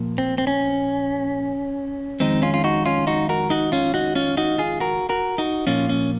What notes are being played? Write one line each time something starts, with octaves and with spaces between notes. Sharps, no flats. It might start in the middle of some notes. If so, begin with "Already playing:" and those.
Already playing: A#2 F3 A#3
C4
C4
C#4
F2 D#3 G#3 C4 D#4
C#4 F4
F4
D#4 F#4
C#4 F4
D#4 F#4
F#4 A#4
D#4 F#4
C#4 F4
D#4 F#4
C#4 F4
D#4 F#4
F4 G#4
F#4 A#4
F#4 A#4
D#4 F#4
A#2 F3 A#3 C#4 F4
C#4